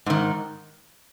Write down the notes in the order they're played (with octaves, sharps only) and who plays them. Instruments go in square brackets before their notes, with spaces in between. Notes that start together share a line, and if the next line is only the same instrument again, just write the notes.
[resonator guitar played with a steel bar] G#2 D#3